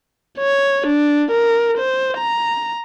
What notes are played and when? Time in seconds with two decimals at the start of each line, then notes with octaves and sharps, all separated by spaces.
0.38 C#5
0.87 D4
1.31 A#4
1.78 C5
2.17 A#5